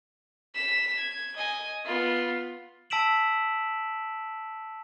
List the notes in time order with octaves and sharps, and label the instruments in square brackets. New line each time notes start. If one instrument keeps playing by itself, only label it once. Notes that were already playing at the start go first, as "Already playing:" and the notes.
[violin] B6 E7
G#6
D#5 G#5
B3 F4
[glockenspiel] A5 E6 B6 D7 E7 F#7